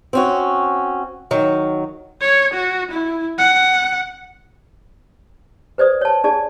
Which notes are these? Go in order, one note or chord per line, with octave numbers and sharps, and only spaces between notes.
C4 C#4 F#4
D#3 F#3
C#5
F#4
E4
F#5
B4 C5 D5 D#6
C#5 A5
D4 G#4 D5 A5